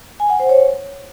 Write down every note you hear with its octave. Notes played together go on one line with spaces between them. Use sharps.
G#5
F#5
C5
C#5